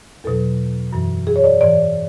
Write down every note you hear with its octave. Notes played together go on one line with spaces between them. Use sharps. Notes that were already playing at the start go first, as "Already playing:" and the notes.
E2 B2 F#3 A4
F#2 E3
G#4
C#5
D5
G#2 E3 D5